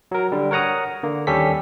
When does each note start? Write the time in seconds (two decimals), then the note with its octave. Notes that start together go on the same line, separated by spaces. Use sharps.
0.11 F#3 A#4
0.32 D3 G3
0.51 A#4 C#5 F#5 A#5 D#6
1.03 D3 A#3
1.27 D#2 G3 C#4 G4 A4 B6